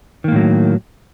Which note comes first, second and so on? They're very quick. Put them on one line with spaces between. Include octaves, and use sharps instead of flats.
D#3 A#3 A2 F#3